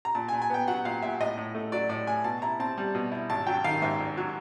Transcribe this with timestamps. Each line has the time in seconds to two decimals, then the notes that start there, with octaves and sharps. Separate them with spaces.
0.05 A#5
0.15 A#2 A5
0.28 G#5
0.33 A#2
0.42 G#5
0.50 B3 G5
0.68 F#3 F#5
0.85 A#2 F5
1.02 A#2 E5
1.20 A2 D#5
1.38 A2
1.55 A3
1.72 F#3 D5
1.89 A2 D5
2.07 A2 G#5
2.24 B2 A5
2.42 E4 A#5
2.60 C4 A5
2.78 G3
2.95 B2
3.12 E4
3.30 G#1 A5
3.47 F#3 G5
3.64 D#3 F5
3.82 G#2 E5
4.00 G#1
4.17 F#3